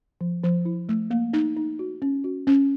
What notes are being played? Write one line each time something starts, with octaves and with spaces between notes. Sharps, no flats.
F3
F3
E4
A3
A#3
D#4
D#4
F#4
C#4
F#4
C#4